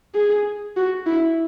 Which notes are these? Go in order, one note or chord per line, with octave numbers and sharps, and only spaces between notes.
G#4
F#4
E4